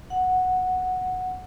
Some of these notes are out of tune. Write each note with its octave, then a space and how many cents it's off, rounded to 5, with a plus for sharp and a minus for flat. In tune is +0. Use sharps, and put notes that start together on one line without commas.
F#5 -5